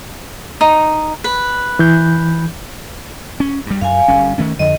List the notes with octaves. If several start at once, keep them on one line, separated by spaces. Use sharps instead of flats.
D#4
B4
E3 G6
C#4
G2 G3
F#2 F5 G#5
G1 G3 C#4
D#3 A3 C#4
F2 D3 D#5